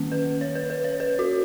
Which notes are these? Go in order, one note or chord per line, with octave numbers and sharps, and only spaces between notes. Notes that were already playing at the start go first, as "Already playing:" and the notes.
Already playing: D#3 A#3 C#4
B4
C#5
B4
B4
C#5
B4
F#4